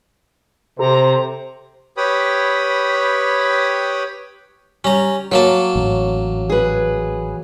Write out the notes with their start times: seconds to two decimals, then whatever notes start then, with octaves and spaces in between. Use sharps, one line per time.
0.79 C3 G4 A4 C5 A#5
1.97 G4 B4 C#5 G5 B5 D#6
4.84 G3 C#4 A#5
5.32 F#3 A#3 C#5 A5
5.76 A1
6.50 G#4 B4